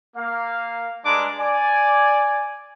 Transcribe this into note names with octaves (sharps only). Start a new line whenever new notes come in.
A#3 F5
G3 G#3 D4 B4 A#5 D6
D5 G#5